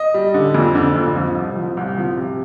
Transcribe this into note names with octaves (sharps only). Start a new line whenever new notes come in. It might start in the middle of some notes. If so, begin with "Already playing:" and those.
Already playing: D#5
G3
D3
F2
D3
F2
F3
C2
F3
C2
F3
C3